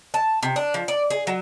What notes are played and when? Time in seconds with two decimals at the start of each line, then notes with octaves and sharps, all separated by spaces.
0.14 A5
0.43 C3
0.56 D4
0.74 F3
0.88 D5
1.10 G#4
1.27 F#3